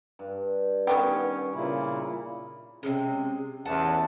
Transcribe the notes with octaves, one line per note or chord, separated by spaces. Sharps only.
G2
D#3 B3 C#4 G4
A#2 C#3 A#3 E4
C3 F3 G#3 C#4
A1 E2 F#5 A5